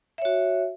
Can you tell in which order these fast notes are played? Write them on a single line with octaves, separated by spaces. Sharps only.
E5 C#5 F#4